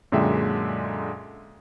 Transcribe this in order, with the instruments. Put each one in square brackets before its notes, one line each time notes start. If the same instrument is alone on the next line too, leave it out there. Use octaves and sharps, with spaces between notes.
[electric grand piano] F#2 A#2 D3 G#3 E5 G5